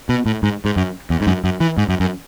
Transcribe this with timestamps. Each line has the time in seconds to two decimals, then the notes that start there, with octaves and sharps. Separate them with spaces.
0.09 B2
0.26 A2
0.43 G#2
0.65 G#2
0.76 F#2
1.10 E2
1.21 G#2
1.27 F#2
1.44 F#2
1.60 E3
1.78 G#2
1.89 F#2
2.00 F#2